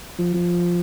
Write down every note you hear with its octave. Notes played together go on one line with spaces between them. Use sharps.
F3
F3